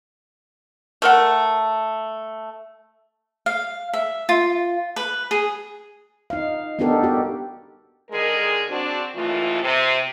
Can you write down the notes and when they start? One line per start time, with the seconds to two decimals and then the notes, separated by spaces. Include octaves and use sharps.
1.02 A3 A#4 F#5
3.46 F5
3.93 E5
4.29 F4
4.96 B4
5.31 G#4
6.30 D#4 F5
6.79 B3 D4 D#4 G4 A4 A#4
7.03 F#4 G4
8.11 D3 D#3 G#3 G#4 A#4
8.69 C4 D4 F#4
9.15 D#2 C#3 E3 A3 F4
9.62 C3